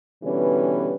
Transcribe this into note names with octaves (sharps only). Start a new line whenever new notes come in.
B2 D3 E3 G3 C#4 B4